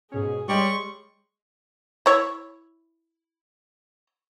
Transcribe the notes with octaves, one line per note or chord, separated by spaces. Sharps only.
G#2 B2 C#4 G#4
G3 G#3 C#5 D#5 C6 C#6
E4 C#5